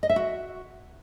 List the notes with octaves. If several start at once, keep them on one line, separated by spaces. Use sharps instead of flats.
D#5
E5
F#4